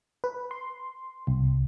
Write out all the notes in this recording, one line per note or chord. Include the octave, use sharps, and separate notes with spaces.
B4
C6
C2